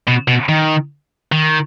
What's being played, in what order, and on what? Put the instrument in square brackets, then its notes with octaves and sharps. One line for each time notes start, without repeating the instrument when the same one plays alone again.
[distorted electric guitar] B2
B2
D#3
D#3